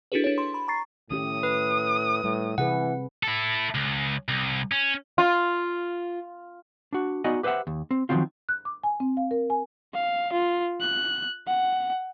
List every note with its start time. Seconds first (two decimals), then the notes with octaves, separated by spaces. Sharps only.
0.12 D4 E4 F#4 G#4 A4 B4
0.24 D4 C#5
0.38 C6
0.54 B5
0.68 A#5 C#6 A6 C7
1.10 A2 D#3 C#4 G4 D#6
1.43 B4
2.24 A2 G3
2.58 C3 E3 G#4 B4 F#5
3.23 E4 A4
3.75 C#2
4.28 C2
4.72 C#4
5.18 F4
6.93 D4 F#4
7.24 B3 D#4 F#4 D5 D#5 G#5
7.43 G4 B4 C5 D#5 E5 F#5
7.67 D#2
7.91 C4
8.09 D#3 F3 F#3 C4 F4
8.49 F#6
8.65 D6
8.84 G#5
9.00 C4
9.17 F5
9.31 A#4
9.50 G#5
9.93 F5
10.33 F4
10.81 F#6
11.47 F#5